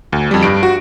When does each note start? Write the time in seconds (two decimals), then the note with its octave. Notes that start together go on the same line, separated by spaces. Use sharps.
0.13 D2
0.31 F2 G3
0.43 G2 D7
0.63 F#4